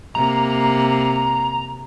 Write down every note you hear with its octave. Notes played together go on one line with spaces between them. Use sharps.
C3 A#3 A#5